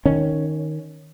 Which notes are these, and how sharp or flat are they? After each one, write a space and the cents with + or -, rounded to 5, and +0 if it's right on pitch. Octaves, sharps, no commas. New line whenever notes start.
D#3 +0 C#4 +0